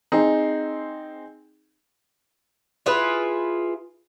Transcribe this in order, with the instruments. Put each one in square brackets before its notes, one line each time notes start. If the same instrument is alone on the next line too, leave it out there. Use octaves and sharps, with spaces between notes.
[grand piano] C4 D#4 G#4
[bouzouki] E4 F4 G#4 B4